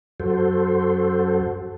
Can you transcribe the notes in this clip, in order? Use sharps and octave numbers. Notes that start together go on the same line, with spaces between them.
F#2 F#4 A4 C5